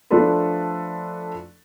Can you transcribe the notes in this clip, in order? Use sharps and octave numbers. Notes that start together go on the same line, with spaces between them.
F3 A3 D4 F4 A4 B4